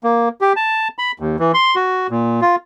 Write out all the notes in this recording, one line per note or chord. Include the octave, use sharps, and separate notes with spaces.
A#3
G4
A5
B5
D#2
E3
C6
F#4
A#2
F4